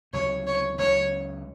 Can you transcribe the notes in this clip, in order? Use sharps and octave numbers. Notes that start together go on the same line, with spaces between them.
C#2 C3 F#3 C#5
C#5
C#2 C#3 F#3 C#5